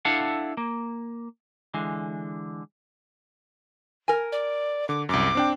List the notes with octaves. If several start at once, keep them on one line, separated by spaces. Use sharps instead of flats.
D4 E4 A4 F5 F#5
A#3
D3 E3 G#3
A#4 G#5
D5
D3 D6
C2 F#2 D6
C4 D4 G5